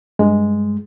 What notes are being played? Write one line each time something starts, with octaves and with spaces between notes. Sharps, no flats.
G2 G#3